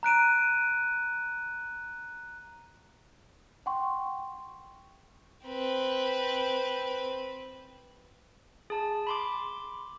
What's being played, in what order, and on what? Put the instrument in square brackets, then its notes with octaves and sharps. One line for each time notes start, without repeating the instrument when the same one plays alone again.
[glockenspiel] A#5 F#6 D7 D#7
[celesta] F#5 G5 C6 C#6
[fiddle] C4 B4
[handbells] G#4 A5
B5 C6 D6